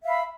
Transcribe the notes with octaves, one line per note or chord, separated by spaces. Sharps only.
E5 F5 B5